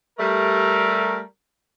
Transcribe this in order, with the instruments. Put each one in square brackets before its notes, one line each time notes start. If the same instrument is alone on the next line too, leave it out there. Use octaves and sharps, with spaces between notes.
[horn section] G3 A3 A#4